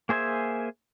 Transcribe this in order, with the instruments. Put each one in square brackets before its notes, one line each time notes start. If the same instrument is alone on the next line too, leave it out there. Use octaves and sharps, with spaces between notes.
[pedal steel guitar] A#3 G#4 C5 E5 G#5